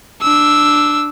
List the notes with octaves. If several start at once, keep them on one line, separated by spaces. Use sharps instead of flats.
D4 E6